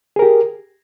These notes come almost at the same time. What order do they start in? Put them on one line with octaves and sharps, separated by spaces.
G#4 A#4 G4